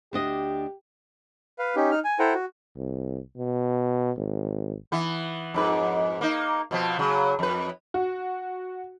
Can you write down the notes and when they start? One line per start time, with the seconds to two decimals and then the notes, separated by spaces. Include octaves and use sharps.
0.13 D2 D4 G4 D#5
1.59 B4 F5
1.76 C#4 D#4 G4
1.92 D#4 F6
2.04 G#5
2.19 E4 A4 C5 F#5 G5 A#5
2.34 F#4
2.77 C2
3.38 B2
4.17 G#1
4.92 E3 B3
5.54 F2 G#2 B4
6.21 A#3 D#4
6.71 B2 F3 C4
6.99 C#3 F#3
7.39 F2 B4
7.94 F#4